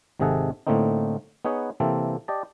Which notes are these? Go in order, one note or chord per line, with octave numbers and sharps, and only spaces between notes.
G#1 C3 D#3 G#4 A4 F#5
A2 D3 A3 A#3 C4 D#4
B3 D#4 G#4 B4 C#5 F#5
C3 E3 A#3 C4 A4
G4 D5 D#5 A5